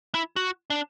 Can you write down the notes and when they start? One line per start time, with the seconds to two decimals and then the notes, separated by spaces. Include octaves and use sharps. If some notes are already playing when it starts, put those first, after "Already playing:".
0.14 E4
0.36 F#4
0.70 D4